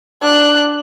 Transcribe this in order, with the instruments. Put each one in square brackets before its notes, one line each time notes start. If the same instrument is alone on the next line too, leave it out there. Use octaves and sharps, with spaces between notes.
[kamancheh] D4 F#6